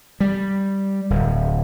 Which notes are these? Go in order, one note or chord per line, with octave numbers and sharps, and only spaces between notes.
G3
D1